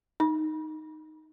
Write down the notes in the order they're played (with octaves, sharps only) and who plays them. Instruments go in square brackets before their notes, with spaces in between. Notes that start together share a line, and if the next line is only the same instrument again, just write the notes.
[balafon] D#4